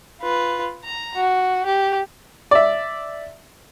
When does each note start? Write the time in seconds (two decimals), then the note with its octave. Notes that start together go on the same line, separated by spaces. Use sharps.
0.22 F4 B4
0.85 A#5
1.16 F#4
1.66 G4
2.51 D5 E5